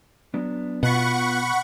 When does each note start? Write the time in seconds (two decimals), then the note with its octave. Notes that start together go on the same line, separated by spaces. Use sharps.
0.34 F#3 B3 D4
0.83 B2 B3 F4 F#5 B5 C#6